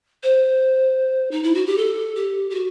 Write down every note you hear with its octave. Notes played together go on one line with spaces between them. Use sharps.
C5
D#4
E4
F#4
G4
A4
G4
G4
F#4